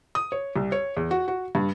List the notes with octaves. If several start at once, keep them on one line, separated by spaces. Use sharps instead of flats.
D#6
C#5
C2
C#5
E2
F#4
F#4
G2